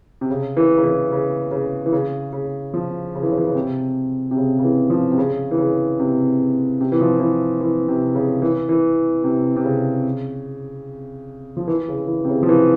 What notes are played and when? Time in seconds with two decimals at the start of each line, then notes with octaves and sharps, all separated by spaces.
0.21 C3
0.30 C#3
0.57 E3
0.78 C#3
0.84 E3
1.12 C#3
1.51 C#3
1.86 E3
1.93 C#3
2.33 C#3
2.74 F3
3.15 C#3
3.23 E3
3.31 C#3
3.38 E3
3.47 C#3
3.55 C3
4.31 C3
4.37 C#3
4.59 C#3
4.64 E3
4.90 F3
5.11 C3
5.18 C#3
5.51 E3
5.58 C#3
5.99 C3
6.81 C3
6.92 E3
7.01 F3
7.20 E3
7.61 E3
7.88 C3
8.15 C#3
8.42 E3
8.69 E3
9.24 C3
9.56 C3
9.64 C#3
11.57 F3
11.68 E3
11.88 C#3
12.08 E3
12.25 C3
12.29 C#3
12.43 F3
12.49 E3